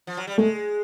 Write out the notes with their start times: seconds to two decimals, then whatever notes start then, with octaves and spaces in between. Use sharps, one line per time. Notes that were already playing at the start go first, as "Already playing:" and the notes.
0.07 F3
0.17 F#3
0.27 G3
0.38 G#3 A3